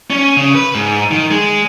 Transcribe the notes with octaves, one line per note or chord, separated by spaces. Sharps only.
C#4
C#3
B4
G#2
D#3
G#3